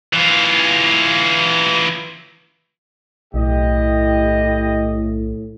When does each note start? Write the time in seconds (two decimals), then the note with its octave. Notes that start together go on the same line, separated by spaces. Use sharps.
0.13 E3 F4
3.34 B1 A2 E4 G4 D#5